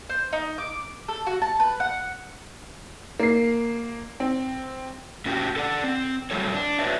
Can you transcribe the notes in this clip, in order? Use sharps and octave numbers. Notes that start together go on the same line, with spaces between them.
C5
D#4
D6
A4
F#4
A5
B4
F#5
A#3 C7
C4
A2 C#4 F#4 G4 G5
A4 D5 F#5
C4
F#3 G3 A3 A4 C#5
D4
F#4 B4 C#5 D5 E5